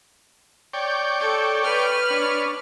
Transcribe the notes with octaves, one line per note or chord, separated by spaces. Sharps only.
C#5 D5 G5
A4
B4 F6
D4 C#5